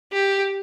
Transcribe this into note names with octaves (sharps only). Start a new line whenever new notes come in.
G4